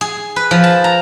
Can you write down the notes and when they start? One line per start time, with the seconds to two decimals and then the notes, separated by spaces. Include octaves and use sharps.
0.01 G#4
0.36 B4
0.51 F3
0.64 A5
0.84 A#5